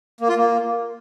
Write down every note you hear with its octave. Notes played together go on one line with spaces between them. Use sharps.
A#3
F4
A#3